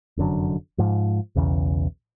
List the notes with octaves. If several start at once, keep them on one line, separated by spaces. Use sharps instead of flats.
F1 F#2 D3 F#3
G#2 F3
B1 E2 C#3